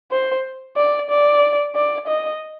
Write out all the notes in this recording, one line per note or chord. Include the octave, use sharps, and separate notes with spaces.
C5
D5
D5
D5
D#5